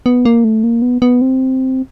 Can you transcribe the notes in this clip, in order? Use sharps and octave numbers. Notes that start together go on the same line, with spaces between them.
B3
A#3
A3
A#3
B3
B3
C4